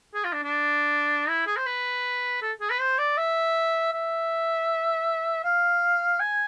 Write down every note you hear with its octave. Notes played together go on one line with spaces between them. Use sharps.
G#4
F4
D4
D4
E4
G#4
C5
B4
A4
G#4
B4
C5
D5
E5
E5
F5
G#5